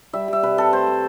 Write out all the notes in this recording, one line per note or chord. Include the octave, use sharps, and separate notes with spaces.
G3 E5
G3 E5
C3 B4
C3 A4
A3 C5
A3